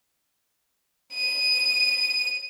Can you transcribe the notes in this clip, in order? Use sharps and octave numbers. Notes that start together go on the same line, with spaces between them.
D#7